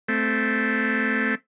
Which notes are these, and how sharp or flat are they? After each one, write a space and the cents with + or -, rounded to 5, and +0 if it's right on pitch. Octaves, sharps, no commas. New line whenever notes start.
A3 +0 C4 -15